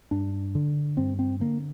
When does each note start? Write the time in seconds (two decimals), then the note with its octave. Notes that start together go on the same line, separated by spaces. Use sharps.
0.11 G2 D4
0.55 D3
0.97 G2 C4
1.19 C4
1.40 D3 A#3